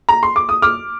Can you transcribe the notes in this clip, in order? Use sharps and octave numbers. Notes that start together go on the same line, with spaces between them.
A#5
C6
D6
D#6
D6 F6